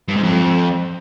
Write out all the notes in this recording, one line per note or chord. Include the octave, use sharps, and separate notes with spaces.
G2
G#2
F2